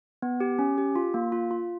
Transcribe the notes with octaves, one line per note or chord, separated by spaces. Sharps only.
B3
G4
C#4
G4
F4
A#3
F4
F4